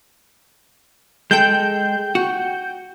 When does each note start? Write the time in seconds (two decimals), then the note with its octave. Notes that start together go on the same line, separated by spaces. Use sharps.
1.31 G#3 A4 G5 G6
2.15 F#4